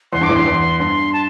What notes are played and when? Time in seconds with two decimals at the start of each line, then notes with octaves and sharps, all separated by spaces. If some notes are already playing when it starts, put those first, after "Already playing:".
0.13 E2 C6
0.21 G2 D6
0.29 E2 A2
0.34 G2 C6
0.46 E2
0.79 G2 C6
1.13 A5